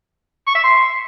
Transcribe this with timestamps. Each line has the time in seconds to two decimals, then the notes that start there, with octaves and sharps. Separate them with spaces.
0.47 C#6
0.55 E5
0.63 C6